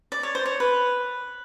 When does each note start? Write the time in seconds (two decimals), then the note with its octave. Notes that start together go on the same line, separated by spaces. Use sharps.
0.12 D5
0.23 C#5
0.35 C5
0.45 C#5
0.60 B4